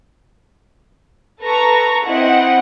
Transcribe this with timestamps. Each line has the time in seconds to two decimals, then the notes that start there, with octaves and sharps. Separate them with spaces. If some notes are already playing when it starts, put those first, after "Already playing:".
1.42 A4 B4 A#5 C#6
2.06 C4 E4 D#5 F#5